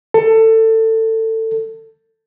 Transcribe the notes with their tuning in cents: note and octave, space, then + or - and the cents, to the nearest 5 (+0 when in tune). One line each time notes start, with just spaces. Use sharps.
A4 +20